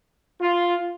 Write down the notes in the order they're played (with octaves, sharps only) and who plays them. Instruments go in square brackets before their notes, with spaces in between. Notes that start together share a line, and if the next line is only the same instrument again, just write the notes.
[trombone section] F4